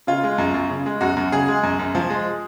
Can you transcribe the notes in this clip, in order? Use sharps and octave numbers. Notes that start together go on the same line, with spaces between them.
C#3 F4
G#3
F#2
F#2
C#3
G#3
F#2 F#4
F#2
C#3 G#4
G#3
F#2
F#2
F3
G#3